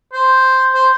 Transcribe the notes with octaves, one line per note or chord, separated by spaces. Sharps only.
C5
C5